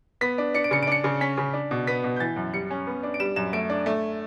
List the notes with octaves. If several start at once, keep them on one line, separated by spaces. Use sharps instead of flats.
B3 B6
D4
D4 C#7
D7
C#3 C#7
D7
D4 C#7
C#3
C#4 B6
C#3
D4
B2
B3 B6
B2
G6
E3 A6
F#2
G3 C#7
C#4
B3
D4
D7
G3 E7
F#2 E7
A3 D7
D4
A3